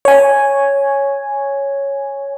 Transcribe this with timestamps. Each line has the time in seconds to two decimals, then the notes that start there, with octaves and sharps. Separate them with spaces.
0.05 C#5 G#5